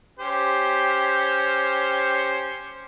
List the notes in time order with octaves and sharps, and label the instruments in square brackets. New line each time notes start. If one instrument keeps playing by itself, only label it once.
[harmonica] C#4 G4 C5